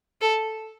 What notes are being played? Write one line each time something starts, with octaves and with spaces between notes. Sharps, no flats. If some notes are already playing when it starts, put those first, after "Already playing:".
A4